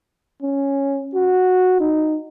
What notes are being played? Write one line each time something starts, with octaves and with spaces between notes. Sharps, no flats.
C#4
F#4
D#4